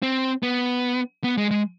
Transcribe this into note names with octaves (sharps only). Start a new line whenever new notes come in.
C4
B3
B3
G#3
G#3